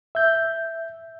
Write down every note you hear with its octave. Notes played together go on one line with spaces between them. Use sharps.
E5 G6